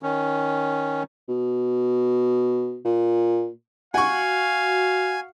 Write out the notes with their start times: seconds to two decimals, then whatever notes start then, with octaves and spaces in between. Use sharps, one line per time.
0.03 D#3 C#4
1.28 B2
2.85 A#2
3.94 F#4 F5 F#5 G#5 C#6